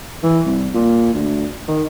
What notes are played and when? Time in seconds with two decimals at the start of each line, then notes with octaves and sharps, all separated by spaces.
0.23 E3
0.46 C2
0.74 A#2
1.14 D2
1.68 D#3